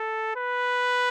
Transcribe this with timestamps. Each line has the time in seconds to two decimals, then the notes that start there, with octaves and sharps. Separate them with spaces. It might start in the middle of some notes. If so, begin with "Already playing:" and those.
Already playing: A4
0.36 B4